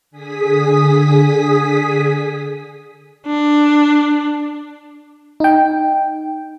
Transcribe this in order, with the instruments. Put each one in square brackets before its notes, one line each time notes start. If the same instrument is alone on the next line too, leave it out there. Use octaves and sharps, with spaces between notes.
[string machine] D3 G#4 D#6 B6
[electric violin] D4
[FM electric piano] D#4 G5